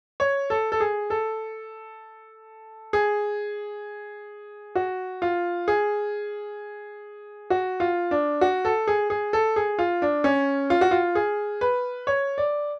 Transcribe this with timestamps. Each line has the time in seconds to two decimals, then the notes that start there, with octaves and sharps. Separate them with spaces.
0.20 C#5
0.50 A4
0.72 A4
0.80 G#4
1.10 A4
2.93 G#4
4.75 F#4
5.22 F4
5.68 G#4
7.50 F#4
7.80 F4
8.11 D4
8.41 F#4
8.65 A4
8.88 G#4
9.10 G#4
9.33 A4
9.56 G#4
9.79 F4
10.02 D4
10.24 C#4
10.70 F4
10.81 F#4
10.91 F4
11.15 G#4
11.61 B4
12.07 C#5
12.38 D5